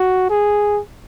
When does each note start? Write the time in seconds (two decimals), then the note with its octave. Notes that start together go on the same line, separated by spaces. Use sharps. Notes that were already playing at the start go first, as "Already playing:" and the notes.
Already playing: F#4
0.30 G#4